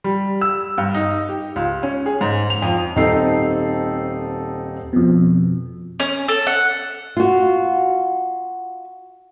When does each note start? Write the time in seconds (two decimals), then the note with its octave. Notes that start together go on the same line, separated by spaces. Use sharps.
0.04 G3
0.41 E6
0.78 G2
0.94 D#4
1.29 G4
1.56 C#2
1.83 C#4
2.06 G#4
2.21 G#2
2.50 F7
2.62 F2
2.95 D#1 C4 D#4 A4 C7
4.93 F2 B2
6.00 C#4
6.28 A4
6.47 F#5
7.17 F4 F#4